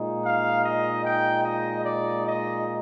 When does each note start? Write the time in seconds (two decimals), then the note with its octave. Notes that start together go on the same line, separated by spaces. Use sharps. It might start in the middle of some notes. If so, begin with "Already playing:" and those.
Already playing: A#2 G#3 D#4
0.23 F5
0.63 D#5
1.03 G5
1.44 D#5
1.84 D5
2.24 D#5